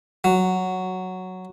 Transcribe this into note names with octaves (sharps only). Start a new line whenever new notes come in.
F#3